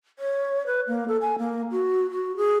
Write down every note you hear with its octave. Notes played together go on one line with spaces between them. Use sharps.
C#5
B4
A#3
A4
G#5
A#3
F#4
F#4
G#4